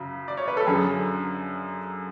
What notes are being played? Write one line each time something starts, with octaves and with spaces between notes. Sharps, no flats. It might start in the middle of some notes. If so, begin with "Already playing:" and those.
Already playing: F#2 C#3 F#3
D5
C#5
B4
A4
F#2 D3 F#3 G#4